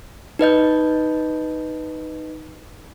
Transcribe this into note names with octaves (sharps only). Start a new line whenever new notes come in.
D#4 B4 D#5 G6